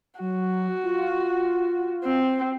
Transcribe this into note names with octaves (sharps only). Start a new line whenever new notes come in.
F#3 F#4
F4
C4